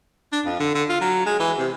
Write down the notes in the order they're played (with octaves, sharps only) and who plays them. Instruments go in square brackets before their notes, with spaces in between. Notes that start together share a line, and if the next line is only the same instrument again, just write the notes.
[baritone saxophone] D4
F2
D3
D3
F4
F#3
G#3
E3
C3